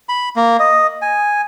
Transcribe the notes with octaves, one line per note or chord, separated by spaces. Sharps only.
B5
A#3
D#5
G#5